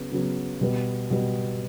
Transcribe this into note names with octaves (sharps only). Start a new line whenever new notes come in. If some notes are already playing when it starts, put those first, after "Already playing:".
Already playing: C#3 F#3 B3
C#3 F#3 B3
B2 G3 B3
B2 G3 B3